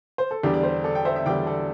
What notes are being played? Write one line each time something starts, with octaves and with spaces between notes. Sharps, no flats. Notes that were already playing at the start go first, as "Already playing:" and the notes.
C5
A4
E2 D3 G3 D4 G4
D5
G4 C5
A4 D5
G5
C5 E5
E5
E2 D3 G3 D5 G5
A4 D5